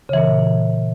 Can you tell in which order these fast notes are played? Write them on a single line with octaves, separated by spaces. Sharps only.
C#3 E3 A#2